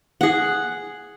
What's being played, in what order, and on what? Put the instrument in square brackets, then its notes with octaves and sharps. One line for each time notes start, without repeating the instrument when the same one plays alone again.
[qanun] G#4 F#5